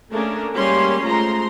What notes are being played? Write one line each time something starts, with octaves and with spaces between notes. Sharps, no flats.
A3 A#3 C#4 D4 G#4 A#4
G3 G#3 A#3 C#4 C6
F3 G#3 A3 A#5 C6